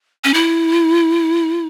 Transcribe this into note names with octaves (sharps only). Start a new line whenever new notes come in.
C#4
E4